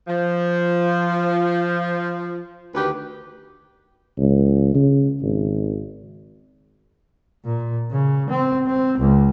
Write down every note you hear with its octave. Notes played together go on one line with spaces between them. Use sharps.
F3
D2 D#3 G4 B4
C#2
C#3
G#1
A#2
C#3
C4
C4
C#2